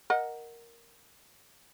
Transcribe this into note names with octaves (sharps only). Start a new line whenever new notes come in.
A#4 D#5 F#5